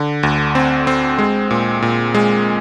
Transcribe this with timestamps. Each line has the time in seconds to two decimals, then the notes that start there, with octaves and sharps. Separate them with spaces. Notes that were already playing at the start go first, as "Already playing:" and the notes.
Already playing: D3
0.23 D2
0.55 C4
0.87 C4
1.19 G#3
1.51 A#2
1.82 A#2
2.15 G#3